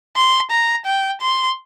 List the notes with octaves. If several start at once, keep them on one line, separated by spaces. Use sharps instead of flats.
C6
A#5
G5
C6